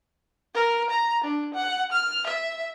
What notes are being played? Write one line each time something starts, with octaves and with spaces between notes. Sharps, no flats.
A#4
A#5
D4
F#5
F6
E5